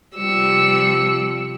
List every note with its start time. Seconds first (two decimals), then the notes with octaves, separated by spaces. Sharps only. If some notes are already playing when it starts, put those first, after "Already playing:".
0.17 C3 F3 G3 E6 C#7